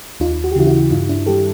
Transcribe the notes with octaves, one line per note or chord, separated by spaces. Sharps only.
D#2 D#4 F4
F#4
G4
C#3 E3 E4 F#4
E4 F#4
G2 D#4 F4
D4 E4
D#3 G3 G4 A4